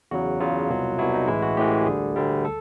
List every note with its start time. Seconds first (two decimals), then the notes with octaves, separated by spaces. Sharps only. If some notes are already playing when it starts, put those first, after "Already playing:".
0.11 E2 C#3 F#3 F#4
0.40 E2 C#3 F#3 F4
0.70 C2 B2 F#3
0.98 C2 B2 F#3 E4
1.13 D#4
1.27 A1 A2 E3 G#3 E4
1.42 F#4
1.57 A1 A2 E3 G#3 G4
1.86 D2 D3 G3 G#4
2.16 D2 D3 G3
2.45 A4